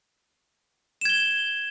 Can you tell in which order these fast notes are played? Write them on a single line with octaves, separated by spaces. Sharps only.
E7 G#6 G7